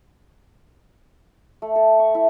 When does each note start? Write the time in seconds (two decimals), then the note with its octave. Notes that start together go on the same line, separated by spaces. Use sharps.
1.62 A3
1.75 A4
1.99 C#6
2.14 E4